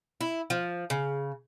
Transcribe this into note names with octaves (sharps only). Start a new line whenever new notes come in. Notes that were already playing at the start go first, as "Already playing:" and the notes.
E4
F3
C#3